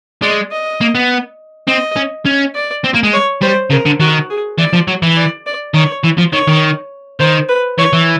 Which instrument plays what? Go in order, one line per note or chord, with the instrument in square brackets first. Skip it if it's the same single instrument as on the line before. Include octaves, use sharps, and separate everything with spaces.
[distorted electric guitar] G#3 [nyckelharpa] D5
[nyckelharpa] D#5
[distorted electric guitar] A#3
B3
[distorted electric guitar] C4 [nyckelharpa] D#5
[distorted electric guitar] C#4
C#4
[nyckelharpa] D5
[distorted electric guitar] C4
A#3
G#3
[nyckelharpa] C#5
[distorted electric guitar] G3 [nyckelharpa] C5
[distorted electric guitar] C#3 [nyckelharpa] A#4
[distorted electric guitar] D3
[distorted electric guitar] D#3 [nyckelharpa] F#4
[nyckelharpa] G#4
[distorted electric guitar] E3 [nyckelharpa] D5
[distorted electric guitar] F3
F#3
E3
[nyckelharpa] D5
D5
[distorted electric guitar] D#3 [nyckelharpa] C#5
[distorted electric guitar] E3
F3
[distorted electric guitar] D#3 [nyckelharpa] C#5
[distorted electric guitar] D#3
[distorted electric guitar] D#3 [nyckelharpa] C5
[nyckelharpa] B4
[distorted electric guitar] E3 [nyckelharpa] C#5
[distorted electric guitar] E3